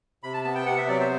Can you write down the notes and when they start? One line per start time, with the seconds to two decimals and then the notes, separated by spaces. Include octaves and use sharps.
0.23 C3 B5
0.33 A5
0.44 B3 A5
0.55 G5
0.66 C3 F#5
0.78 E5
0.88 F#3 D5
1.00 C5